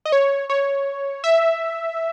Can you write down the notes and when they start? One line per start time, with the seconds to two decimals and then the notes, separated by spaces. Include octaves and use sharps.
0.05 D#5
0.12 C#5
0.50 C#5
1.24 E5